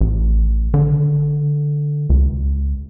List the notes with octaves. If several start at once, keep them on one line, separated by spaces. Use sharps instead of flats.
A1
D3
C#2